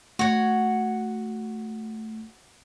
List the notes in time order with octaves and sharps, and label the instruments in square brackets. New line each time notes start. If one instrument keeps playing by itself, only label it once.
[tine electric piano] A3 [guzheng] F#4 C#5